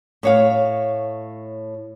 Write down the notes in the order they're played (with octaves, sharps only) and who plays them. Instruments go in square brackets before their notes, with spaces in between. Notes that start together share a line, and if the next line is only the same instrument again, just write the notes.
[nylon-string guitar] A2 C#5 F5